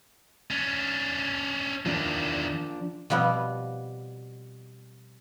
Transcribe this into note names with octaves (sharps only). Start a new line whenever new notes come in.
C#4 D4
E2 D#3 F3 D4
B2 F3 G3 B3 C4